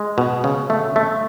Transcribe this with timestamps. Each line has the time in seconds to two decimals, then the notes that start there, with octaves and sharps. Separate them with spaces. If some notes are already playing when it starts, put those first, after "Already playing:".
Already playing: G#3
0.18 B2
0.44 C#3
0.70 A3
0.96 A3